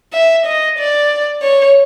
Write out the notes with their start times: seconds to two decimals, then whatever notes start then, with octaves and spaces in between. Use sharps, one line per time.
0.13 E5
0.46 D#5
0.79 D5
1.42 C#5